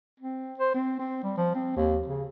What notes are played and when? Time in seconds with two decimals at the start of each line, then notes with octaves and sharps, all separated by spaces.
0.20 C4
0.59 C5
0.74 C4
0.99 C4
1.23 G3
1.37 F3
1.55 C4
1.76 D#2
2.07 C#3